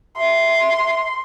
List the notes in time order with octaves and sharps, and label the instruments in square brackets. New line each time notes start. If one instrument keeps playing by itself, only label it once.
[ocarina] E5 [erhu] C6